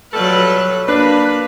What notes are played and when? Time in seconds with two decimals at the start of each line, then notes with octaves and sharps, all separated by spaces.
0.14 F#3 G3 F4 A4 B4
0.88 A#3 D4 B4